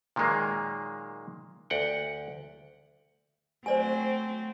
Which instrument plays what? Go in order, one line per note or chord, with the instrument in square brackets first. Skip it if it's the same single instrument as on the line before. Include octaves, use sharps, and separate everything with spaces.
[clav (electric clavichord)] A#2 D#3 F#3 G#3 A#3
D2 F#5 G5
[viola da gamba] F#3 A3 C4 [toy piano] C5 D5 G#5